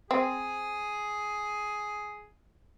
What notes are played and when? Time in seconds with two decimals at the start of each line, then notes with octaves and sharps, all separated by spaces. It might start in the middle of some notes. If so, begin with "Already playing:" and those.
0.11 C4 G#4